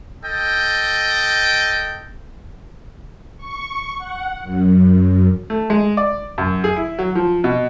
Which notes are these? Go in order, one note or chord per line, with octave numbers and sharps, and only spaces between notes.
A4 D#5 G5
C#6
F#5
F#2
A3
G#3
D5
F#2
G#4
E4
F#3
F3
B2